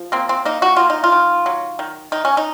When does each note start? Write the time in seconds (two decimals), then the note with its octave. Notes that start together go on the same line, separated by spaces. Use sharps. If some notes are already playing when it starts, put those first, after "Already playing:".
Already playing: F3
0.12 A#3 C4
0.29 C4
0.45 A#3 D#4
0.62 F#4
0.76 A#3 F4
0.90 D#4
1.04 F4
1.12 D#3
1.46 F#3
1.79 D#3
2.12 D#3 D#4
2.25 C#4
2.37 D#4